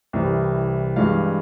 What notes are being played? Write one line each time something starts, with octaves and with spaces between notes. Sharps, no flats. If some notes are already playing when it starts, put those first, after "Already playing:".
C2 C3 E3
G2 E3 G#3 F5